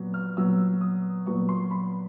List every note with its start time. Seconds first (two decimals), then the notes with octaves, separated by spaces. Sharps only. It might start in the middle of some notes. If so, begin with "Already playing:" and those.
Already playing: A#2 F#3 B3
0.14 F6
0.37 A#2 F#3 B3 E6
0.81 D#6
1.26 A#2 F#3 B3 C#6
1.49 C6
1.71 B5